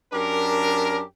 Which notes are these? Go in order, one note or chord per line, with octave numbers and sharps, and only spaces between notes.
F#2 D4 G4 A#4